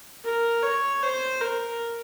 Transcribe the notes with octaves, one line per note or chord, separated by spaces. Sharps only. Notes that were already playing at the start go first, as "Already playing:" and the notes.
A#4
C#5
C5
A#4